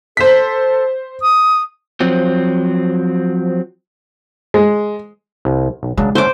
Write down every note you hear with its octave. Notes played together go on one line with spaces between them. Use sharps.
A4 C5 B6
D#6
F3 F#3 C4
G#3
C2
B1
C#3 F#3 G#3 D4
F#3 A3 C#4 C5 D6